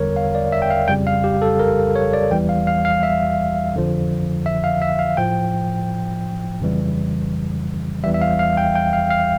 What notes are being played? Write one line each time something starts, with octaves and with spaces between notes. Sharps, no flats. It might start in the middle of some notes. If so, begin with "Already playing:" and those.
Already playing: E2 D3 G3 A#4 C#5
F5
D5
E5
G5
F5
F2 C#3 G3 G5
F5
G4
A4
A#4
C#5
D5
E2 E3 G3 G5
F5
F5
F5
E5
F2 D3 F3
E5
F5
E5
F5
A2 F3 G5
F2 C#3 E3 G3
E2 E3 G3 E5
E5
F5
F5
G5
G5
F5
F5